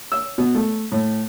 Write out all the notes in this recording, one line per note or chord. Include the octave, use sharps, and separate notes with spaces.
E6
B2
A3
A2